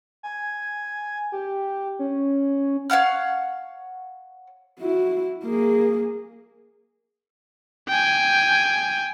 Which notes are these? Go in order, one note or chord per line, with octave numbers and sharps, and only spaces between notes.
G#5
G4
C#4
C#5 F5 F#5 F6
E4 F#4
A#3 G#4
G5 G#5